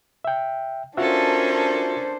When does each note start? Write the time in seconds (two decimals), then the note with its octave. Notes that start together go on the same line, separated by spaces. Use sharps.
0.25 E5 G5
0.97 C#4 D4 F4 F#4 A4 A#4 C5 E5